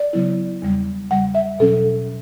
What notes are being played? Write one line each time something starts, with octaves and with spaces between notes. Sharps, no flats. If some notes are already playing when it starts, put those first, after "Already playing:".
Already playing: D5
C#3 F#3 B3 E4
E2 C#3 G3
E2 C#3 G3 F#5
E5
B2 F#3 C#4 A4